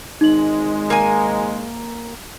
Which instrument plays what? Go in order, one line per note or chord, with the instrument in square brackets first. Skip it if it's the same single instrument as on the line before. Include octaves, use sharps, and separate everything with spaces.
[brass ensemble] G#1 G#2 G#3 [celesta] D#4 F#7
[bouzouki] A#3 G#5